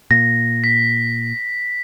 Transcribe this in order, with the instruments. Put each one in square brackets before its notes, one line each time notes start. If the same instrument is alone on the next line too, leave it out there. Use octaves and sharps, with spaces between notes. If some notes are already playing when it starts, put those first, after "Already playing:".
[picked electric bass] A#2 [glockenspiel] A#6
[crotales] B6